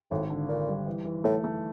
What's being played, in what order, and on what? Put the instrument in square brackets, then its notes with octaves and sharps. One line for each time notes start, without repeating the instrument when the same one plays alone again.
[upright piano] G#1 [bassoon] A2
[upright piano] D3
[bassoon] A#2 [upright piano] D3
[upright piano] G3
E3
E3
[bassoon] A2 [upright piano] A3
[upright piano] A3